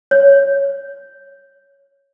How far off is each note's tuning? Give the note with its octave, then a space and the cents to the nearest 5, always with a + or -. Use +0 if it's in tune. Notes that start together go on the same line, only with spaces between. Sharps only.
C#5 +0